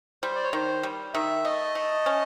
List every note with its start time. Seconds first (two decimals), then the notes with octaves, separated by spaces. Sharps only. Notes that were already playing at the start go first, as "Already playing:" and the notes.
0.23 G3 C5
0.35 D5
0.44 C#5
0.53 D#3 C5
0.83 G3
1.14 D#3 E5
1.45 A3 D#5
1.75 A3
2.06 C#4